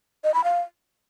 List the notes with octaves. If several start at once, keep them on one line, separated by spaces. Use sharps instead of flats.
D#5
B5
F5